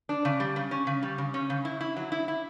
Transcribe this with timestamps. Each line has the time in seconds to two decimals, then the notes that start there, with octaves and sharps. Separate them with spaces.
0.09 D4
0.25 C#3
0.40 G3
0.56 C#3
0.71 C#4
0.87 C#3
1.03 G3
1.18 C#3
1.34 C#4
1.50 C#3
1.65 E4
1.81 E4
1.97 F#3
2.12 E4
2.28 E4